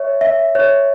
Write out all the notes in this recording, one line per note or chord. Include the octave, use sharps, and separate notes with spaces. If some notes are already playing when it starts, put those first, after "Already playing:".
Already playing: C#5 E5
E5
C#5